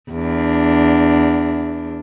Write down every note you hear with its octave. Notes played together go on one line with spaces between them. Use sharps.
E2 D4